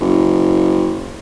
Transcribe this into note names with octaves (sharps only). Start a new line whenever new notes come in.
F#1